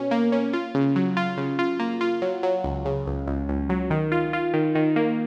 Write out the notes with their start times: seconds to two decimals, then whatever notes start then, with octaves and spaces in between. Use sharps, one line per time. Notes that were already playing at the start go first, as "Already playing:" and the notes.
Already playing: B2 C#4
0.11 A#3
0.32 C#4
0.53 F4
0.75 C#3
0.96 F#3
1.17 F4
1.37 C#3
1.59 F4
1.79 A#3
2.01 F4
2.22 F#3
2.43 F#3
2.64 C#2
2.85 C#3
3.06 C#2
3.27 C#2
3.48 C#2
3.69 F#3
3.90 D#3
4.12 F4
4.33 F4
4.54 D#3
4.75 D#3
4.96 A#3